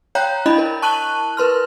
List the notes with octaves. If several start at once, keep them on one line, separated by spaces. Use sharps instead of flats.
C#5 F5 G5 A#5 F#6 G6
D4 E4 D#5 B5
A#4
A5 C#6 F#6 D#7 F#7
A#4 B4 C6 F6